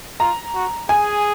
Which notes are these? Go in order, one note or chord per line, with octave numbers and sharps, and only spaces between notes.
F4 A#5
F#4
G#4 G#5